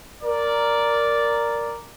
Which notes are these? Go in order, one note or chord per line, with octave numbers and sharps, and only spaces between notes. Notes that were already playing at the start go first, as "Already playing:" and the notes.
A#4 D5